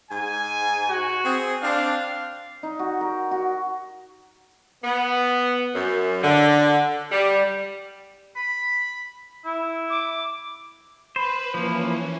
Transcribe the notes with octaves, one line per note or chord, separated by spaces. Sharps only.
G#2 G#5
F#4
C4 G#4
C4 D4 F5
D#4
F#4
A#4
F#4
B3
F#2
D3
G3
B5
E4
D6
B4 C5 B5
E3 F3 A#3 C#4